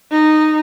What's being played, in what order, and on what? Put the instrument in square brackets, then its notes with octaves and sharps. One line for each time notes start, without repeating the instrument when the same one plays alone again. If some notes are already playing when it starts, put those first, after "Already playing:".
[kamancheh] D#4